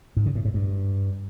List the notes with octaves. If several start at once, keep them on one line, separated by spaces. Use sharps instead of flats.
G#2
C#3
A2
G#2
G2